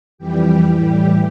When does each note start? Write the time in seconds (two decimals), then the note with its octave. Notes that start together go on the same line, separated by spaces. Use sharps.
0.18 F2 E3 G3 G4
0.68 A2 E3 G3